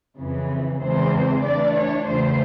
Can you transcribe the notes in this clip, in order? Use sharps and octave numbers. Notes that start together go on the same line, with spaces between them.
F2 C#3 E3
E2 C#3 E3 G#3 C4 C5
E3 A3 D4 D5
C#5
E2 C#3 F3 A3 C5